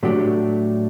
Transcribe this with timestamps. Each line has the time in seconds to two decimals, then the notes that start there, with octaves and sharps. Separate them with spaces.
0.03 A2 F#3 A3 D4 G4